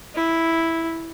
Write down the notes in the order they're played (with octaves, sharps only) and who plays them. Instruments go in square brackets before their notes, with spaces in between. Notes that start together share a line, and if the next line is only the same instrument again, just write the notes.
[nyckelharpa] E4